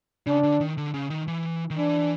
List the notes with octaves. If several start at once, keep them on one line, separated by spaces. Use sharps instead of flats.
C#3 D4
D3
D#3
D3
C#3
D#3
E3
D#3
E3 D4